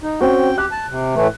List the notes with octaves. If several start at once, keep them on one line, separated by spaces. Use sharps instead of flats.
D#4
C4 C#4 F#4 G5
G4 F#6
A5
C3
A2 E3 A3